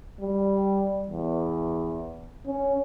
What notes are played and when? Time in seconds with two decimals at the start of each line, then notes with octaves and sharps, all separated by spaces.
0.21 G3
1.08 E2
2.47 C#4